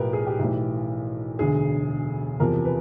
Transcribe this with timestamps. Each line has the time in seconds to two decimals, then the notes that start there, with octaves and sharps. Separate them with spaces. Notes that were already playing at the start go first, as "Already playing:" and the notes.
Already playing: B1 A2 F3 G4 A#4 B4
0.13 G#4
0.27 G4
0.39 B1 A2 E3
1.39 E1 D2 D3 G#4
2.40 E2 C3 F3 A#4
2.65 B4